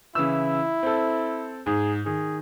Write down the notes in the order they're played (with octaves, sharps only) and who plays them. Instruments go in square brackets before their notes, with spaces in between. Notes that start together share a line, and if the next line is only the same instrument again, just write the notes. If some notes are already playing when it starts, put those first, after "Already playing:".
[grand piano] C#3 E3 E6 [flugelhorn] E4
[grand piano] C4 A4
[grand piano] G#2 [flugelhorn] G#4
[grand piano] D#3 [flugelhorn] G#4